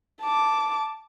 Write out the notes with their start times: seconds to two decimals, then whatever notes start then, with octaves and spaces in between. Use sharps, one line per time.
0.21 A5 D6